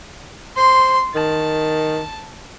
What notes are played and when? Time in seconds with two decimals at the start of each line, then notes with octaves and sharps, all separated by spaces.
0.57 C5 C6
1.15 D#3 A5